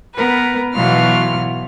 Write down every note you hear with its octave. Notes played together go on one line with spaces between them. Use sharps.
B3 A#4 B4
B2 E3 F#3 F4 F6